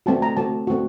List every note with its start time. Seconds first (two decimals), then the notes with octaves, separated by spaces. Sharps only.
0.06 A3 C4 F#4 A5
0.22 A#5
0.37 A3 C4 F#4 A5
0.67 A3 C4 F#4